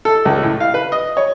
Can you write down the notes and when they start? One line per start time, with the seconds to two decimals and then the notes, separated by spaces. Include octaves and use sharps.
0.05 A4
0.25 C#2
0.43 A2
0.60 F5
0.74 B4
0.92 D#5
1.17 C#5